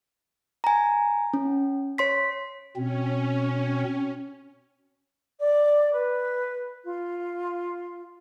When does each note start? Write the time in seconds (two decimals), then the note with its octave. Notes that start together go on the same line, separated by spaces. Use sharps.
0.64 G#5 A#5
1.34 C#4
1.98 C#5 C6 B6
2.76 B2 C4 C#4
5.39 D5
5.92 B4
6.84 F4